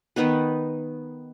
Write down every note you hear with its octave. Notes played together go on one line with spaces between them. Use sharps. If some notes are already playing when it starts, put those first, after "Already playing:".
D#3 B3 D#4 B4